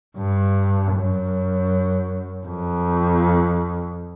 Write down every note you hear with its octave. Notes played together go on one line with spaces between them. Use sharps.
G2
F#2
F2